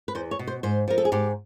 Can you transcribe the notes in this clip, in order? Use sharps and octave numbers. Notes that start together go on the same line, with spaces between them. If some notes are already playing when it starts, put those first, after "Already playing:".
B4
E2 C5
C#5
B2
C5
G#2 C5
F3 A#4
A4
G#4
G#2 G4